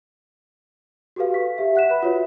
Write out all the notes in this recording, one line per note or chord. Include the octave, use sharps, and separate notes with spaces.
F#4 G4 A4 B4 F5
C#6 B6
G4 E5
E5 F#5 F#6 B6 E7
B4 B5
F4 F#4 C#5 E5